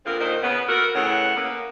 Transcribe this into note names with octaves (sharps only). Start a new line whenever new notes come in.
A#2 D3 B3 C4 F4 A#4
A#2 D#3 C5
C#3 B3
B3 F#4 A4 A#4
A2 C#3 E3 E5 F#5
A#3 B3 C#4